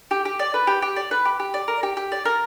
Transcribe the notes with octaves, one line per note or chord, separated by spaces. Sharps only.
G4
G4
D5
B4
G4
G4
D5
B4
G4
G4
D5
A#4
G4
G4
D5
A#4